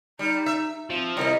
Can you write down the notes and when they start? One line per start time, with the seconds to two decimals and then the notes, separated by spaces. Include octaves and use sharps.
0.19 G3 D#4
0.46 E5
0.90 F3 C4
1.17 C3 G3 D#4 E4 A#4 D#5